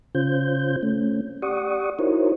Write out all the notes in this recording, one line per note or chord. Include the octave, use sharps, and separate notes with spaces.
C#3 C#4 F4 C5 G6
A3 C#4
G4 D5 F#5 C#6 D#6
D#4 E4 F#4 A#4 C5 C#5